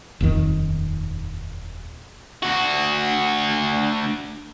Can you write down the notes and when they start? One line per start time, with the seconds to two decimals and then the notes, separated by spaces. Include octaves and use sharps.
0.21 D#1 F2 D#3
2.43 D2 F#4